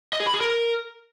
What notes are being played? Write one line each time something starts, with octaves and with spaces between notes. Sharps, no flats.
D#5
G#4
B5
G#4
A#4